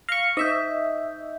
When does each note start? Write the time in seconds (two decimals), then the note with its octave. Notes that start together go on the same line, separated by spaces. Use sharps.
0.09 F5 C#6 A#6
0.37 D#4 D#5 E5 D#6 G6